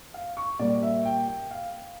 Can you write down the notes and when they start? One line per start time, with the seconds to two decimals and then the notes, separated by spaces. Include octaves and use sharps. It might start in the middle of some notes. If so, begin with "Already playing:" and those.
0.14 F5
0.37 C#6
0.59 A#2 G3 A#3 D5
0.83 E5
1.05 G5
1.28 G5
1.51 F5